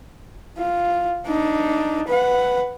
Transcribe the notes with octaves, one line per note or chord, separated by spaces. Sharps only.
F4
D4 D#4
B4 F#5